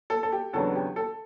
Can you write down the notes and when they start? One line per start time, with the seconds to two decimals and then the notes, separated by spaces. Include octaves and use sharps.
0.10 A4
0.23 A4
0.32 G4
0.53 E2 C#3 F#3 B3 D4 A4
0.76 G4
0.96 A4